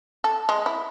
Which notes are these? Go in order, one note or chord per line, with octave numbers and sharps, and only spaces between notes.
A4
G#3
E4